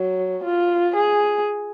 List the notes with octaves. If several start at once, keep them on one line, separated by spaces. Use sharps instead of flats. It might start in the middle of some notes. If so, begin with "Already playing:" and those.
Already playing: F#3
F4
G#4